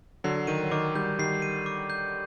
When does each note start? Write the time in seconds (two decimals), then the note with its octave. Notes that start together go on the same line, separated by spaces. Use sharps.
0.24 D3 F#3 C7
0.47 D#3 D#7
0.63 F#3
0.71 D#3 D6
0.95 D#3 G3 G6
1.19 D#3 G3 C7
1.42 D#7
1.66 D6
1.90 G6